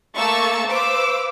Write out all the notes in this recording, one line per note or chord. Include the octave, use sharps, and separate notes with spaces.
A3 A#3 C#6 E6 A6
B4 C5 F5 D6 E6